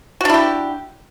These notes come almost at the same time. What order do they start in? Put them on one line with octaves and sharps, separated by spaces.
F#4 D4 E4 G4